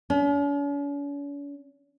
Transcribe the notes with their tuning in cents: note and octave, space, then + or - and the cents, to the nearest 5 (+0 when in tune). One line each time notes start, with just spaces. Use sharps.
C#4 +45